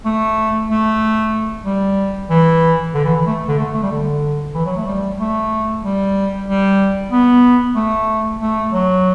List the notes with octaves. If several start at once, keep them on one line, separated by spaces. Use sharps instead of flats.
A3
A3
G3
E3
D3
E3
E3
A3
D3
A3
A3
G3
D3
E3
F#3
A3
G3
A3
G3
G3
B3
A3
A3
F#3